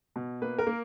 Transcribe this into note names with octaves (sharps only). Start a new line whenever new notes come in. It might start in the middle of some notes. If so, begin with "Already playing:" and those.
B2
A#3 B4
A#4
A#3